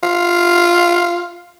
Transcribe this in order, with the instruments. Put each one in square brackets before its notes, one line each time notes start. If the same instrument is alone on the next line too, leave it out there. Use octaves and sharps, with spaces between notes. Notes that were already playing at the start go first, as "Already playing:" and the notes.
[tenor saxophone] F4